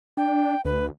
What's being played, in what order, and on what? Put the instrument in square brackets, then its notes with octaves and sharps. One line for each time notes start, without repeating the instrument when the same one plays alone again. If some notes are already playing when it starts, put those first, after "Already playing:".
[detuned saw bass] D4 [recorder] G5
[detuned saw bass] D2 [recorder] B4